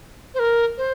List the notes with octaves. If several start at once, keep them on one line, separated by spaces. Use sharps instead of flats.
C5
A#4
C5